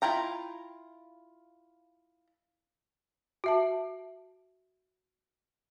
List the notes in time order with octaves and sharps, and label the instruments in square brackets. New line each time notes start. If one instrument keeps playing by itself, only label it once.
[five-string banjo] E4 F4 G5 A#5
[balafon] F#4 E5 A5